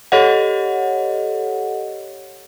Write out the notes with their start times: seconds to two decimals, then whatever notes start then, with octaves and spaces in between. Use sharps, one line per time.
0.12 G4 A4 C#5 D#5 F#5